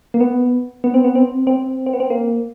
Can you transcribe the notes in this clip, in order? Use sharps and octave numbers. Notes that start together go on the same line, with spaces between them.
A#3
B3
B3
C4
B3
C4
C4
C4
B3
C4
A#3